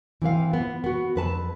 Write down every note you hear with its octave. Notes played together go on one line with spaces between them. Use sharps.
E3 C4 B4 F5
B3 F4
B3 F#4
F2 B4 A5